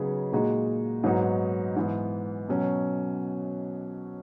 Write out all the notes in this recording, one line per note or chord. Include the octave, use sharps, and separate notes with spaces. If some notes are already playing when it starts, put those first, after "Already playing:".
Already playing: C#3 F#3 B3 D#4 G#4
A#2 G#3 D#4 F#4
G#2 F#3 B3 D#4 F#4
G#2 E3 B3
B2 F#3 C#4